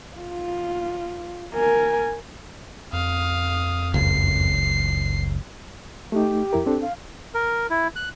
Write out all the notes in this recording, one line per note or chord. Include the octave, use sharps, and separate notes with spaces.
F4
A#4 G#5
F2 F5 D#6
F#1 C#2 C7
A3 D#4 G4
F2 E4 A#4
C4 D4 A4
F5
A#4
E4
F#6